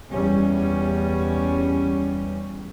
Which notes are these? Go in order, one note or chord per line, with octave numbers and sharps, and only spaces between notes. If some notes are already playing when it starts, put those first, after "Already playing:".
E2 G3 C#4